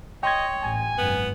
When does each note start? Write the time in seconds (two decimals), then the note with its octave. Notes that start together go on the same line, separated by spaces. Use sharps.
0.23 C#5 D#5 G5 C6 G#6
0.62 A1 G#5
0.98 G#1 F#2 B3